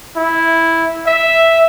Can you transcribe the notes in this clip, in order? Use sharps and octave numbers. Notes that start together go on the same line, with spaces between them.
E4
E5